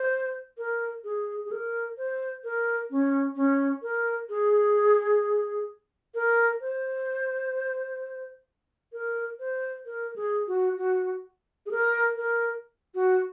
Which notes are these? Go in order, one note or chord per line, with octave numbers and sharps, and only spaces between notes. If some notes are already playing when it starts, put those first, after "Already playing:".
Already playing: C5
A#4
G#4
G#4
A#4
C5
A#4
C#4
C#4
A#4
G#4
A#4
C5
A#4
C5
A#4
G#4
F#4
F#4
G#4
A#4
A#4
F#4